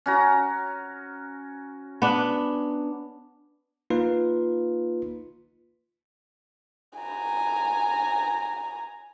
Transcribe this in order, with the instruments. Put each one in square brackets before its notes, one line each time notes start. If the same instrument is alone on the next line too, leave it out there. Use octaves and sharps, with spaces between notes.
[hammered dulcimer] C#4 F#4 A#5
[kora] B3 D4
[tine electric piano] A#3 D#4 F4 B4
[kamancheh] G#5 A#5